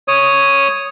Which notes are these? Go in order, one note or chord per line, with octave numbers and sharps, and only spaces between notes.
C#5 D#6